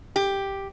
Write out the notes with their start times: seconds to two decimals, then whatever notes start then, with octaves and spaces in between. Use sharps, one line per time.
0.16 G4